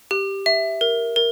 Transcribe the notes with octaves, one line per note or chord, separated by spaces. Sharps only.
G4
E5
A#4
A#4